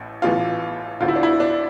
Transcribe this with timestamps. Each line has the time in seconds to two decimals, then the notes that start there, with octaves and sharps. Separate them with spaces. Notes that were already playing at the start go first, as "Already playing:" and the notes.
Already playing: A1 A2
0.22 A1 A2 E3 F4
1.01 D2 D3 F4
1.08 E4
1.16 D4
1.23 E4
1.40 D4